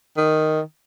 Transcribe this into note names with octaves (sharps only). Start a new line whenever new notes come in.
D#3